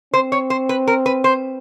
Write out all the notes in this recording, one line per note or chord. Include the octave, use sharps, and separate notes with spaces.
C4 C5
C#5
C5
B4
A#4
B4
C5